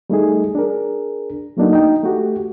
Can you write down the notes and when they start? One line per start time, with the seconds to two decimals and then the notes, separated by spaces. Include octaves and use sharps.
0.10 G3 A3 D#4 G#4
0.55 D4 G#4 A#4
1.57 F#3 A3 A#3 D4 D#4 F#4
1.73 D#4 G5
2.03 A3 F#4 G4